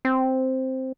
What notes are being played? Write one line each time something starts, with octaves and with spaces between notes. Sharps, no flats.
C4